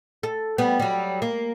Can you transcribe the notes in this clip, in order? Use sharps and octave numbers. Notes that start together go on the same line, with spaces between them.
A4
G3 B3
F#3 G3
A#3